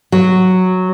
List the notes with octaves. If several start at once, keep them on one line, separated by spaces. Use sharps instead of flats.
F#3